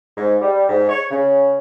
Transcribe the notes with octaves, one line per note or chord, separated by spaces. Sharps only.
G#2
G3
G#2
C#5
C#3